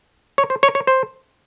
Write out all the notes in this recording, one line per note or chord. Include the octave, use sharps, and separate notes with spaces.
C#5
C5
C#5
C#5
C5